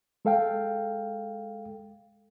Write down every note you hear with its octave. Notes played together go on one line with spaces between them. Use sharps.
G#3 A4 F5 G5